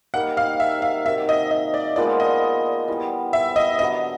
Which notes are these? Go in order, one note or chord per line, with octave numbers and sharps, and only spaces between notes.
G3 A#3 D#4 F#5
F5
E5
F5
C3 D#3 F#3 A#3 E5
D#5
D#5
D5
A#2 F3 G#3 B3 D5
D#5
E3 G3 B3
E5
D#5
D3 F#3 B3 D#5